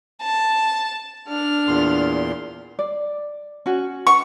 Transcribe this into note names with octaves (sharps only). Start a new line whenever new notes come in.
A5
D4 F6
E2 A#2 C6
D5
C#4 F#4
F#5 C#6